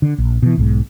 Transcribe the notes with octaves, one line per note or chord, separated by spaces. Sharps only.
D3
A#1
B2 E3
B1 G#2